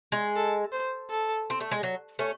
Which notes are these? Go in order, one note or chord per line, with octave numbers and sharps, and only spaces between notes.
G#3
A4
C5
A4
C4
A3
G#3
F#3
A3 C#4